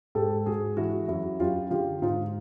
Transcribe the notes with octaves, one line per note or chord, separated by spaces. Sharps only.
G#2 G4 A4
G#2 F#4 G#4
E3 E4 F#4
F#2 E4 F#4
F#2 F4 G4
D3 F4 G4
G#2 D#4 F4